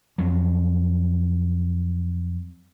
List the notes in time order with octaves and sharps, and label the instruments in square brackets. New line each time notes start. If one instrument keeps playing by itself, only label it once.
[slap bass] F2 F#3